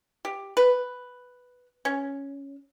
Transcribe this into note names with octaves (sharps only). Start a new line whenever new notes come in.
G4
B4
C#4